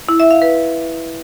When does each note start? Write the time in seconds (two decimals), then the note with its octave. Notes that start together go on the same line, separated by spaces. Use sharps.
0.09 E4
0.20 E5
0.31 F5
0.42 B4